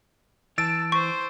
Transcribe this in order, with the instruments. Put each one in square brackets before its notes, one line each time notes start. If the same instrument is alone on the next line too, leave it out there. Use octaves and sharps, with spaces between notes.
[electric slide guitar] E3 [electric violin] A5 [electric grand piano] E6 A6 D7
[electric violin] C5 [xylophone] C#6